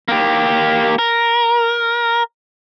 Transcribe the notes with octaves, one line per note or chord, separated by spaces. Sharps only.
A#3 G4
A#4